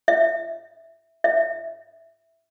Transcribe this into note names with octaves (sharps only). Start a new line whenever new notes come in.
E5
E5